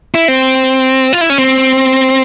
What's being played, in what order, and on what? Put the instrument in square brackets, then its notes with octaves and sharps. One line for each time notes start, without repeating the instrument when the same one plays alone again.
[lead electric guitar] E4
C4
F4
E4
C#4
C4